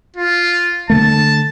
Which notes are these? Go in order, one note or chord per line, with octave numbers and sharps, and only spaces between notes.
F4
D3 A3 A5